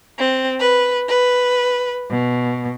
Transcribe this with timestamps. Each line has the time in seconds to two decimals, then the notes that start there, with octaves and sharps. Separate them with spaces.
0.20 C4
0.61 B4
1.09 B4
2.10 B2